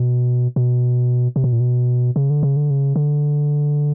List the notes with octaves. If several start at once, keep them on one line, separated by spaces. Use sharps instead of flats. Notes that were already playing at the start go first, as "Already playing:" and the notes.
Already playing: B2
B2
C3
B2
A#2
B2
C#3
D3
C#3
D3
C#3
D3